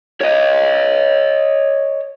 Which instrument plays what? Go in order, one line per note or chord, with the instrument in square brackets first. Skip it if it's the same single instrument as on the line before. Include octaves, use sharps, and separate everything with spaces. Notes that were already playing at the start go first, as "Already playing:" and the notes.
[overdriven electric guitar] C#5 D#5